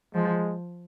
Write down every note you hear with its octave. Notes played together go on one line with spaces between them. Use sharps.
F3 G#3